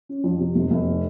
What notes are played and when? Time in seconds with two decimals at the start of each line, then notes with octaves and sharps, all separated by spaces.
0.09 C#4
0.24 F2
0.40 C3
0.55 F1
0.71 F1